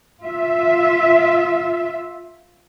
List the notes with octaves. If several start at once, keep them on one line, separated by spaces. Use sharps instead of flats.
F4 E5